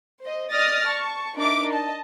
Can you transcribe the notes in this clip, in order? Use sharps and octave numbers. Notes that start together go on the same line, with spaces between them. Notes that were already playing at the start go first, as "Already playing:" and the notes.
C5 D#5
D5 D#5 D#6 F6 A6 A#6
A5 C#6
D4 D#4 A#4 E5 D6
D#5 A5